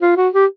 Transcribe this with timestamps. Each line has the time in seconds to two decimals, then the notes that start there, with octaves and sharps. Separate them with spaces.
0.01 F4
0.17 F#4
0.34 G4